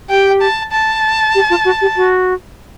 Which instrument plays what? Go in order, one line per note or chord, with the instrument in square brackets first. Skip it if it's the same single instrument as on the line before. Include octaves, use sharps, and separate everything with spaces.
[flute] G4 [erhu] G5
[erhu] A5
A5
[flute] G4
F4
F#4
G4
F#4